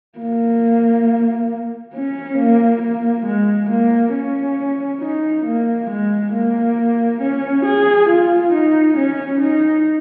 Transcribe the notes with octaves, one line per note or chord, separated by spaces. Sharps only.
A#3
C#4
A#3
A#3
G#3
A#3
C#4
D#4
A#3
G#3
A#3
C#4
G#4
F4
D#4
C#4
D#4